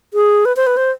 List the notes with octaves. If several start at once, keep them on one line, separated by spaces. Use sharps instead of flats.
G#4
B4
C5
B4
C5